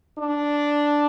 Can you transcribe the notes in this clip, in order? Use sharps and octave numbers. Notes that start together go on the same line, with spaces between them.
D4